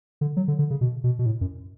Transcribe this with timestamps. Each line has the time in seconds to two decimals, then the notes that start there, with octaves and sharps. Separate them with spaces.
0.21 D3
0.37 F#3
0.48 D3
0.59 D3
0.70 C#3
0.81 B2
1.04 B2
1.19 B2
1.26 A2
1.41 F#2